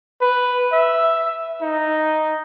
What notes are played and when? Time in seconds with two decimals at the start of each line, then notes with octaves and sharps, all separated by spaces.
0.21 B4
0.73 E5
1.62 D#4